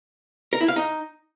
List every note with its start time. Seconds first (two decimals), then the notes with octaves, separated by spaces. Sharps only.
0.53 A#4
0.61 E4
0.68 F5
0.76 D#4